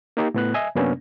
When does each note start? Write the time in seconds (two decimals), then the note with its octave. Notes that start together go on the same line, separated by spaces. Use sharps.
0.17 A#3 D#4 G4
0.34 A2 B3 F#6
0.54 D#5 E5 G#5
0.75 F#2 C3 A#3 B3 C#4 D4